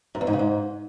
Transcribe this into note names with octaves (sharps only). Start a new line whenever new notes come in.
F#2
E2
G#2
C#3
G#2